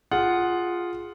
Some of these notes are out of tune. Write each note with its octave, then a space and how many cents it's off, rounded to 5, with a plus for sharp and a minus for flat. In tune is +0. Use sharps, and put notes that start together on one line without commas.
F4 +0 G#4 -5 F#5 +0